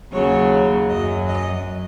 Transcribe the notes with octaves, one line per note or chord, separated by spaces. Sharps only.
D#2 C#3 F#3 C#5
F#2 F#3 D#5
D#5